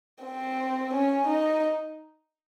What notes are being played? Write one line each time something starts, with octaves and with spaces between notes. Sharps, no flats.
C4
C#4
D#4